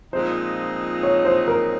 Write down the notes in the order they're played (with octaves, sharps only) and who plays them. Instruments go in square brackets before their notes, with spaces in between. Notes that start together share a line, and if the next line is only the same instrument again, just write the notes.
[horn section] A#2 F3 G#3 C4 D#4 [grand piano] C5
[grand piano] C#5
C5
A#4